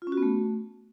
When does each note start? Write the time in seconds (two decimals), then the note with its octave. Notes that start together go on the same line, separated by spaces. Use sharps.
0.02 F4
0.07 C#4
0.12 F#4
0.17 B3
0.23 A3